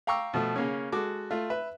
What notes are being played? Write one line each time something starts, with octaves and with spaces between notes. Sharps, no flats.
F5 G5 A#5 C#6 D6 E6
B2 F3 A3
C#3 A#3 C#4
G#3 F#4 A4 D6
A3 F4
B4 E5